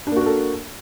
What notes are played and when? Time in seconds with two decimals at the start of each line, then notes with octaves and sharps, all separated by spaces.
0.07 D4
0.12 A#3
0.17 F#4
0.21 A#4
0.26 A4